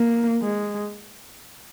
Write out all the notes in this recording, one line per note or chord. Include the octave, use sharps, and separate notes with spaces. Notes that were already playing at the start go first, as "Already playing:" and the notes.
Already playing: A#3
G#3